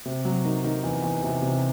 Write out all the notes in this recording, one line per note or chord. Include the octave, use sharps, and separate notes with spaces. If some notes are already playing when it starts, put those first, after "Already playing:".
C3
F#3
D#3
D#3
E2
E2
C3
C3